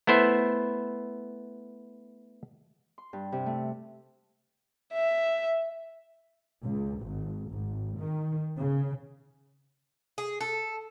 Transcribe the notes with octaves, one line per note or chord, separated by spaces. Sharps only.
A3 B3 E4 C5 E5
C6
G2
C3
A3
E5
C#2
G#1
G#1
D#3
C#3
G#4
A4